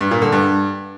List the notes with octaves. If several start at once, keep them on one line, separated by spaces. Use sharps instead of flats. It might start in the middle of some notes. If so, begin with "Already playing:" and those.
G2
A#2
D3
G2